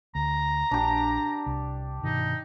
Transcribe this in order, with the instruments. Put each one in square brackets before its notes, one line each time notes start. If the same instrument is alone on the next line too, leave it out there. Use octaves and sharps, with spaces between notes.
[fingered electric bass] D2 [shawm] A#5
[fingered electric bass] A#1 [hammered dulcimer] D4 G4
[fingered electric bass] C2
[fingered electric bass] G2 B2 D#3 [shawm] D#4